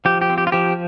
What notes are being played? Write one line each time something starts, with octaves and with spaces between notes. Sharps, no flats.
F3 G4
G4
C4
G4
F4
F3 G4